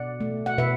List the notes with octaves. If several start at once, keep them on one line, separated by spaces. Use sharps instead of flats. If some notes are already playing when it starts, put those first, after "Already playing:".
Already playing: B2 D5 F#5
A3
F#5
B2 B4 E5